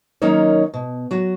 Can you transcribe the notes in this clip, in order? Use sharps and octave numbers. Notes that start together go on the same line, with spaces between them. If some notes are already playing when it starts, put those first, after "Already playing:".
D#3 F#3 A#3 C#4 D#4 C#5
B2
F#3 F#4